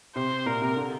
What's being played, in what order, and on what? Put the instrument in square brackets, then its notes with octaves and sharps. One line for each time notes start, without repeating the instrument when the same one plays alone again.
[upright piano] C3 [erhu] C5
[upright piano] A#2 [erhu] A#4
[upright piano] C3
D3